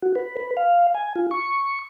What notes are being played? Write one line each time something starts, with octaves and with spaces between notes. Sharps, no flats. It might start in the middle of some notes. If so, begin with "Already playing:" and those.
F#4
B4
B4
F5
G#5
F4
C#6